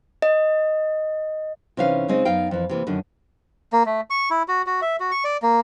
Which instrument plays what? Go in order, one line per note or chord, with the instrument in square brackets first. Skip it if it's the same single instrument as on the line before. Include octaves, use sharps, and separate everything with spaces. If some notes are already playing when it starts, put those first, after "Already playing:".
[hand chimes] D#5
[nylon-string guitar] C3 E3 C#4 D#4 B4 F5
C#3 G#3 C4 D#4 D#5
F#2 B3 D#4 F5 G5
F2 E3
C3 E3 A#3
F#2 D3 D#3
[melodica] A#3
A3
C#6
E4
F#4
F#4
E5
F#4
C#6
D5
A#3